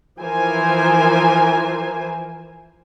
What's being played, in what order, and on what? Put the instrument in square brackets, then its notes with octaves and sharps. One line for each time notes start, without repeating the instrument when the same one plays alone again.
[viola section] E3 F3 A#4 C5 G#5